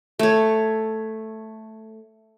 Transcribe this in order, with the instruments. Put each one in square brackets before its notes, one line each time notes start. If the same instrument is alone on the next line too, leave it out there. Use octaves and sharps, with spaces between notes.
[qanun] A3 C#5